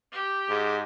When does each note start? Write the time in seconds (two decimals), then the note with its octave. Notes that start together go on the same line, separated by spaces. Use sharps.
0.12 G4
0.49 G#2 G#4